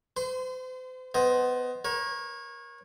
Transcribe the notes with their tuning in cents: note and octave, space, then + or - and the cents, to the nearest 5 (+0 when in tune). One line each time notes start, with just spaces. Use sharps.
C5 -40 C6 -25
B3 +20 C5 +0 D#5 +10
A#4 +30 C#5 -25